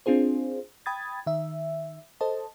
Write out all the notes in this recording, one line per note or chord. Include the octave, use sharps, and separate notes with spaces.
C4 D4 F4 G#4 C5
G5 B5 D#6 G#6 A6
D#3 E5
A4 C5 D#5 A5